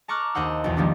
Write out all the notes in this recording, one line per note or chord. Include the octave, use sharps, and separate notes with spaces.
A5 A#5 C#6 D6 F6 F#6
D#2 D#4 C5 F#5 E6
B1 E2
D#3 F3 G3 A#3 D4 E4